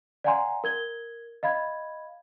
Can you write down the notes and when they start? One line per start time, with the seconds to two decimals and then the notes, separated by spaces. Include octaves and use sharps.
0.24 D5 F5 F#5 G#5 A#5 C6
0.64 A#4 G#6 G7
1.43 D#5 F5 B5 G#6